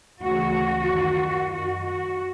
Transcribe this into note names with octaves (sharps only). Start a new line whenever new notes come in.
D2 C#3 E3 F#4
F#2 D#3
F#2 D#3 F#4
F#4